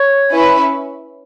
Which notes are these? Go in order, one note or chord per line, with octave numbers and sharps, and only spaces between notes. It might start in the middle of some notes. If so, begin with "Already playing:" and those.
Already playing: C#5
C#4 E4 B4